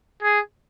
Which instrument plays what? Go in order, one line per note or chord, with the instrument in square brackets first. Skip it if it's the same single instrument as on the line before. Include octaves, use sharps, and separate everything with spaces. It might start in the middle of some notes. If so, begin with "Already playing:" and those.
[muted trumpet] G#4